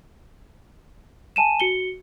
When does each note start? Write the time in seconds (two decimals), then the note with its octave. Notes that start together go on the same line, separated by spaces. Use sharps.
1.36 G#5 A5 D#7 E7
1.60 F#4 C#7 G7